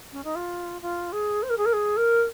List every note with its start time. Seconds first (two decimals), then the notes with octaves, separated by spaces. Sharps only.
0.12 C#4
0.24 D#4
0.35 F4
0.81 F4
1.12 G#4
1.42 C5
1.49 A#4
1.57 G#4
1.65 A#4
1.72 G#4
1.96 A#4